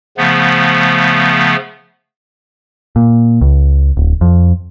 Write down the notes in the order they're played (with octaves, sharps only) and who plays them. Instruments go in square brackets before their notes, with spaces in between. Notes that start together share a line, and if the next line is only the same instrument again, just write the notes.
[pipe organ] C#3 F3 A3 B3
[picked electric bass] A#2
C#2
D1
F2